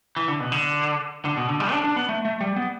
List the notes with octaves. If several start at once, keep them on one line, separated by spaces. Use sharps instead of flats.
E3
D3
B2
D3
D3
B2
D3
G3
D4
D4
B3
A3
A3
G3
B3